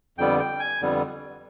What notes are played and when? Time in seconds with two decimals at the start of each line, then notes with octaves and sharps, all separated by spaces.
0.18 F2 D3 G3 B3 G5
0.40 G5
0.59 G#5
0.81 F2 D3 G3 B3